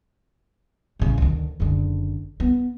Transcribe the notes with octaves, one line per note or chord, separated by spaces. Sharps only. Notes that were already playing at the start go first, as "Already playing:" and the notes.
A1 C#3
D2 D#3
F#1 D3
B3